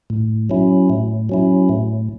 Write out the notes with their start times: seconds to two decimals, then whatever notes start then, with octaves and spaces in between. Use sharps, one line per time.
0.10 A2
0.50 F#3 C#4 E4
0.90 A2
1.29 F#3 C#4 E4
1.69 A2